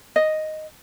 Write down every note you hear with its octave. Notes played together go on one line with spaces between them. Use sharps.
D#5